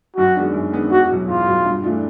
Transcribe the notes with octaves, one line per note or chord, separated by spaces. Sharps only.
F#2 F#4
D#3 G#3 B3 D4
F#2
D#3 G#3 B3 D4
E2 F#4
B2 F#3
E2 F4
B2 F#3
G2
E3 A3 D4 F4